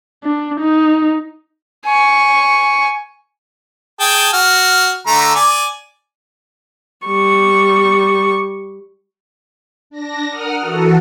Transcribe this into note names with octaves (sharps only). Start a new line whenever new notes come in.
D4
D#4
G#5 C#6
G#4 G5 A5
F#4 F6
D3 A3 A#5
D5 G#5
G3 C#6
D4 A#6
A#4 F#5 D#6 F6
E3 F#4 A4